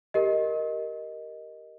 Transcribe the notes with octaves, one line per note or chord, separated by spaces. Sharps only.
G4 A#4 D#5